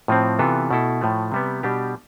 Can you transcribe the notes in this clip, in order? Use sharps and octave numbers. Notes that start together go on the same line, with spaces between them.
A2 F3 C4
C3 E3 B3 F4 A4
B2 A3 E4 A4
A2 F3 A3
C3 G3 B3
B2 G3 D4 G4